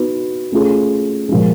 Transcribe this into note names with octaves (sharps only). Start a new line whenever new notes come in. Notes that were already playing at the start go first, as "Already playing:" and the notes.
Already playing: B3 D#4 F#4 B4
A3 C#4 F4 G#4
A#2 F3 G#3